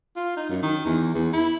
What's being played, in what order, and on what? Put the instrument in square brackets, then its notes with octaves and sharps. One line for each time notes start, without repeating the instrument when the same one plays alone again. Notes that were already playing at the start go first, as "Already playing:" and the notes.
[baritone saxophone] F4
D#4
F#2
D#3
E2
E2
E4